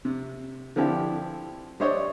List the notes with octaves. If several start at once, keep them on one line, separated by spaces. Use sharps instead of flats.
C3
D3 F3 C4 E4 G4
G3 D4 C5 C#5 D#5